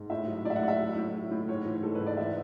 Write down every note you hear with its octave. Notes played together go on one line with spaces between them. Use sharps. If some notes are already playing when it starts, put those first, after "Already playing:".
Already playing: G#2
A2 E5
F#3
A2 D5 E5
F#5
A2
E5
F#3
A2
A2
A2
G#2 C#5
E3
G#2 A4
B4
G#2
D5
E3 E5